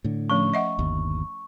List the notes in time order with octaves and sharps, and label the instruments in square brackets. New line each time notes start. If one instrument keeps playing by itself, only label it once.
[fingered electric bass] A2 D3
[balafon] F3 A3 C#4 [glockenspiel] C#6
[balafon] D#5 E5 F#5
[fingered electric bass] G1 D#2